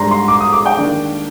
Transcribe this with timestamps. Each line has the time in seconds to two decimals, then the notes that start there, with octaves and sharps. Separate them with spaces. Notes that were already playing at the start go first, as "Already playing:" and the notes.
Already playing: G#2 G3 D4 A#5 C6
0.11 C6
0.28 D6
0.41 D#6
0.53 D6
0.66 G5
0.78 D#3 A#3 D4